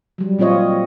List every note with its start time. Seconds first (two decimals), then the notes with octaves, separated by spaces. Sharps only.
0.18 F#3 G3
0.39 A#2 C4 F4 C#5 D#5